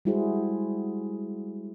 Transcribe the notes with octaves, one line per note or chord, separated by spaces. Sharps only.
G3 G#3 E4 F#4 G#4 C5